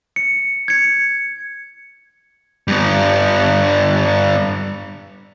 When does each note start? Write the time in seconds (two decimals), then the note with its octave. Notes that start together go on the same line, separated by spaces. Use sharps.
0.16 C#7
0.68 G#6 C#7
2.68 G2 B3